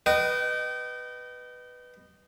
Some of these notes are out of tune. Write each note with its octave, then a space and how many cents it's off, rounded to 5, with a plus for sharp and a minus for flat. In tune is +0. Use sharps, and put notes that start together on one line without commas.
B4 +0 D#5 -20 G5 -30